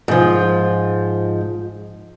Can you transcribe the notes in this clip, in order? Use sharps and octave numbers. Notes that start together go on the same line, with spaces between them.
G#2 F3